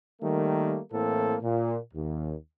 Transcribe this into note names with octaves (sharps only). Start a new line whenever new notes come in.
D#3 G3 A3 A#3
A2 E3 A#3 C4 A4
A#2
D#2